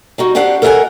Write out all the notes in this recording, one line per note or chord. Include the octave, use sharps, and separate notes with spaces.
G3 D#4 F#4
C4 D4 G4 F5 F#5
A4 A#4 D#5 E5 F#5 G#5